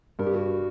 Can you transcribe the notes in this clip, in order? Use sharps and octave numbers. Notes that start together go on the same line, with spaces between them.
G2 A#4
G4
F#4